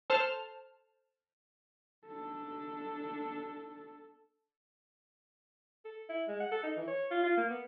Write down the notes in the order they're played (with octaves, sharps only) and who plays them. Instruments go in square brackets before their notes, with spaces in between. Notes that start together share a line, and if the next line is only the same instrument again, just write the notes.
[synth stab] A4 C5 A5 F6
[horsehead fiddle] D4 A4
[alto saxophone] A4
E4
G#3
F#5
A4
D#4
E3
C#5
F4
F4
A#3
B3